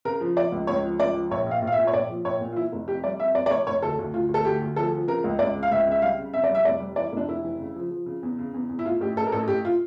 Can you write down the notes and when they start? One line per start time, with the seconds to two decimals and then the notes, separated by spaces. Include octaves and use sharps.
0.05 C#3 A#4
0.21 F3
0.36 F3 D5
0.52 C#2
0.67 C#2 C#5
0.84 F3
1.00 C#2 D5
1.15 F3
1.31 A#1 C#5
1.46 A#1 F5
1.62 A#1
1.67 F5
1.73 E5
1.77 A#2
1.87 C#5
1.93 A#1 D5
2.09 F3
2.25 A#1 C#5
2.41 A#2
2.52 F4
2.56 E3 E4
2.72 F1
2.88 F2 G4
3.04 G3 D5
3.20 F2 E5
3.35 F2 D5
3.46 D5
3.51 F1 C#5
3.67 F1 C#5
3.82 D2 A4
3.99 D2
4.14 D2 F4
4.29 D2
4.34 A4
4.45 D2 G4
4.62 D2
4.76 F3 A4
4.93 F3
5.08 C#3 A#4
5.24 C#2
5.39 C#2 D5
5.55 C#3
5.63 F5
5.71 C#2 E5
5.86 C#3 E5
6.02 G3 F5
6.18 C#3
6.33 F2 E5
6.44 D5
6.49 G3
6.55 E5
6.65 F1 D5
6.80 G3
6.96 E3 D5
7.12 F1 D4
7.29 F1 E4
7.44 E3
7.59 C#3
7.76 F3
7.91 F3
8.06 C#3
8.23 E2
8.38 C#3
8.54 E2
8.69 E2
8.79 E4
8.86 A2 F4
9.01 A1 G4
9.17 A1 A4
9.27 A#4
9.32 A1 A4
9.48 A1 G4
9.65 F4